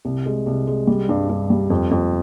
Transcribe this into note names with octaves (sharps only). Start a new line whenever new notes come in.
C2
G#3
C2
G#3
G3
G2
G2
G3
F2
F2